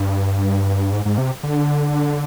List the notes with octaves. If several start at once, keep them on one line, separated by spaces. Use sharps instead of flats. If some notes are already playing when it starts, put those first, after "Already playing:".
Already playing: G2
G#2
G#2
C3
D3